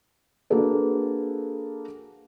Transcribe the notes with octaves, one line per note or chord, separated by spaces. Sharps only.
A#3 D4 F#4 G#4 A4 B4